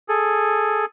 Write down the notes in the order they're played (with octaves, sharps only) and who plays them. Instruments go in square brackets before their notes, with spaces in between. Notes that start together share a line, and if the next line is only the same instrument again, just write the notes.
[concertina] G#4 A4